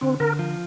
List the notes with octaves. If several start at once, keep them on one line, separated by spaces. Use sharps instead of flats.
D3 C4
D3 A#4
F3